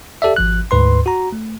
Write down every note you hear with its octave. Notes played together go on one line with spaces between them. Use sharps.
G4 A4 D5 E5
G#1 F3 F#6
D2 G#2 B4 C6
F#4 A#5
A3